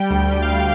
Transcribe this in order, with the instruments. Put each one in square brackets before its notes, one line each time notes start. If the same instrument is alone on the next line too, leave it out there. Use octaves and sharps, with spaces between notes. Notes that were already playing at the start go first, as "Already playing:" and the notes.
Already playing: [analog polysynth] G3 G5
D2
G5
D2
F5
D2